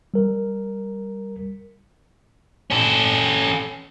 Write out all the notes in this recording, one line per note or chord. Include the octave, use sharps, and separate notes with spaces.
G3 A#4
C#4 A4